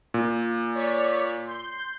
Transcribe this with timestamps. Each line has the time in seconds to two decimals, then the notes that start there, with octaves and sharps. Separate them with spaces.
0.14 A#2
0.75 C#5 D5 B6
1.47 C6 G6